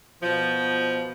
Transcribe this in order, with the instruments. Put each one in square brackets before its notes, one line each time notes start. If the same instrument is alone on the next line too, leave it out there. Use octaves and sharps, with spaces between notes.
[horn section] B2 F3